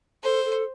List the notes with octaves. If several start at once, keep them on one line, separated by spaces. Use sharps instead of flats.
A4 C5
A4